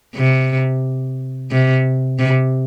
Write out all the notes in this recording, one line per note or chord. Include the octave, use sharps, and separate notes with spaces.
C3
C3
C3